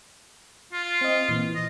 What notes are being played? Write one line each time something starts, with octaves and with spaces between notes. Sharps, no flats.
F4
C4 D#5
A#2 E3
D#5